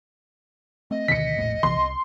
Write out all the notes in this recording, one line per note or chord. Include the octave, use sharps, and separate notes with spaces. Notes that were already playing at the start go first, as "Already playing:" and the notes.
A3 C4 D#5
D2 B2 D#3 B6 C#7
E1 A#1 A2
A#1 C3 E3 C6
C2